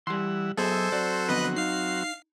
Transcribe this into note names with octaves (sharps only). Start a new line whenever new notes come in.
E3 G3 F#5 C6 E6
F#3 B3 G#4 A4 C5 D#5 E5 G#5
F#3 C4 F#4 D5
D3 F3 B3 B4 D#5 F#6
D#4 F5 C7